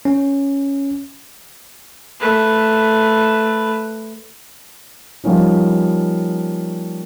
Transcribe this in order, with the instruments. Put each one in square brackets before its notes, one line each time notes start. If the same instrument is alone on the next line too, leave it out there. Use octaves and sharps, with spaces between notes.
[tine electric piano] C#4
[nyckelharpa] A3 B4
[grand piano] F3 G3 A#3 C#4 D#4